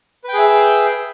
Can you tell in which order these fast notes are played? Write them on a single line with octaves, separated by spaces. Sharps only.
B4 G5 G#4 E5